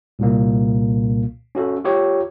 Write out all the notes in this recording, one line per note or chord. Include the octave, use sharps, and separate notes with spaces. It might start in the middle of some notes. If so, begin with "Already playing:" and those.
C2 A#2 A#3
C#4 F#4 A4
F4 G4 C#5